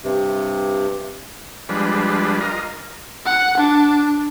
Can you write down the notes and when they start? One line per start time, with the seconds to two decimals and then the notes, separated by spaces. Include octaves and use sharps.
0.04 G2 C3
1.69 F3 G3 G#3 D4 B4
2.40 F4 A#4 D#5
3.25 F#5
3.57 D4